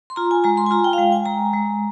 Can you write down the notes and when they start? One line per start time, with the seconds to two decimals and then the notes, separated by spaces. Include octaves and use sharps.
0.10 C6
0.16 F4 A#5
0.31 G#5
0.44 G#3 A#5
0.57 C6
0.66 G#5
0.71 F4 A#5
0.84 G5
0.93 F5
0.98 G#3 G5
1.12 G#5
1.26 G#3 A#5
1.53 G#3